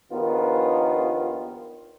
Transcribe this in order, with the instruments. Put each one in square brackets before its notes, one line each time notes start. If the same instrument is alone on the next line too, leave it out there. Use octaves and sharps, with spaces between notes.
[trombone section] A#1 D#2 D#3 B3 F4